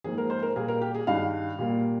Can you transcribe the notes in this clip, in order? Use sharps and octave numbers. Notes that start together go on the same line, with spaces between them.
G#2 F3 A#3 G#4
A#4
C5
A#4
A#2 G3 A#3 G#4
A#4
G4
G#4
G2 D#3 G3 F5
A#2 G3 A#3